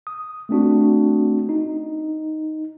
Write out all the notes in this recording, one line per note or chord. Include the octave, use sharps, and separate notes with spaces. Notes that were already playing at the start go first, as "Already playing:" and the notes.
D#6
A3 C4 D4 F#4
D#4